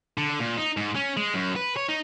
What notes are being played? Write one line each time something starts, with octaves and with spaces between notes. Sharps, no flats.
D3
A#2
D#4
G#2
C#4
G#3
F#2
B4
C#5
D#4